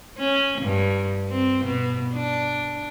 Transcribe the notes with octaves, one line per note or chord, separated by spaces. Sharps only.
C#4
G2
C4
B2
D4